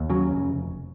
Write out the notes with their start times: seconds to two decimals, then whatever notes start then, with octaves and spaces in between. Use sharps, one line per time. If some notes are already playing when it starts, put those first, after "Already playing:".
Already playing: D#2
0.09 C#3 F#3
0.29 F1